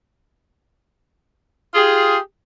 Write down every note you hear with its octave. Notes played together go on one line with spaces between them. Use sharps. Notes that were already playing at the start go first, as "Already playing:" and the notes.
F4 G4 G#4